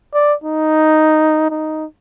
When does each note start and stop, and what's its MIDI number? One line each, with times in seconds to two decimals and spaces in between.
0.14 0.34 74
0.44 1.50 63
1.50 1.85 63